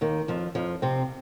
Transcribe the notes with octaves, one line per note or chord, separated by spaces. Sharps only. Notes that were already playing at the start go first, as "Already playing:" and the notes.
D#2 D#3
F2 F3
F2 F3
C3 C4